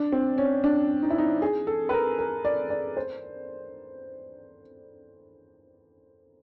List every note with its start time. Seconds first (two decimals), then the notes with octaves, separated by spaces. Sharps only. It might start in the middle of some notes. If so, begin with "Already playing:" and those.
Already playing: D4
0.12 C4
0.38 C#4
0.64 D4
1.03 D#4
1.10 E4
1.18 D#4
1.42 G#4
1.67 A4
1.89 B4
1.93 A#4
2.19 A#4
2.45 D5
2.70 D5
2.97 C5